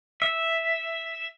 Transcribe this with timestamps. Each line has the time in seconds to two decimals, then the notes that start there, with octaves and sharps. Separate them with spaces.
0.22 E5